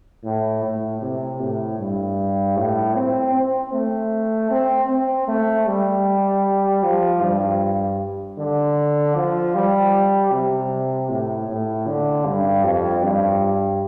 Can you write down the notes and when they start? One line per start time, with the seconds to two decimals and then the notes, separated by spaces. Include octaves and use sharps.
0.24 A2
0.63 A2
1.02 C3
1.40 A2
1.79 G2
2.57 A2
2.96 C4
3.34 C4
3.73 A3
4.50 C4
4.89 C4
5.28 A3
5.67 G3
6.83 F3
7.22 G2
8.38 D3
9.16 F3
9.55 G3
10.32 C3
11.09 A2
11.48 A2
11.87 D3
12.25 G2
12.64 F2
13.03 G2